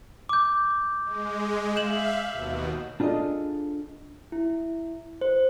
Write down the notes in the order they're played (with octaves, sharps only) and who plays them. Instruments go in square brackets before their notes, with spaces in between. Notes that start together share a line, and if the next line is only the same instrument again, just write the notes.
[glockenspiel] D6 G6
[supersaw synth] G#3
[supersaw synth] E5 F5 [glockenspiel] G6 E7 F#7
[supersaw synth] D#2 B2
[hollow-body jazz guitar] D4 F4 G#4 A4 D#5
[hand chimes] E4
C5